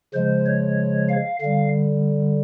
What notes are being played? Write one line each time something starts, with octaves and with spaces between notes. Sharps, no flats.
C#3 F3 G#3 C5
C#5
F5
D3 G3 F5